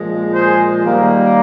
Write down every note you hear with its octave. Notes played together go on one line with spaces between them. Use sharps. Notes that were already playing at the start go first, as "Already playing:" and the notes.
Already playing: A#2 F3 G#3
G#4 C5
D#3 G3 A#3